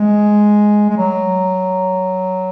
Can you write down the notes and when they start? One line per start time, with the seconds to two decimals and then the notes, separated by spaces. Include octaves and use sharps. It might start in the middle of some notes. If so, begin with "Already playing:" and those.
Already playing: G#3
0.90 G#3
0.97 F#3